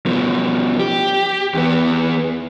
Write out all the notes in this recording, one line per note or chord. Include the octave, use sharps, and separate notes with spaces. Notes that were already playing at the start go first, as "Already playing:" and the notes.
B2 F3
G4
E2 B3